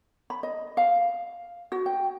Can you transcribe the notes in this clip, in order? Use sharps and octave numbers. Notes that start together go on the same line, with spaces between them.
B5
D#5
F5
F#4
G5